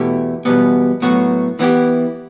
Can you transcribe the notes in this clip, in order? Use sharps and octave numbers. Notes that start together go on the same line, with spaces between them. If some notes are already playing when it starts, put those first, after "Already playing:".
Already playing: E2 B2 A3 E4 G4
E2 B2 G3 B3
A2 F#3 B3 F#4
E3 B3 E4 G4